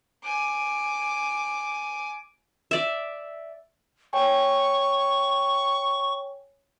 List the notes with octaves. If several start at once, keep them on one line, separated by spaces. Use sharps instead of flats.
G#5 D6
D5 E5
C#5 G5 G#5 C#6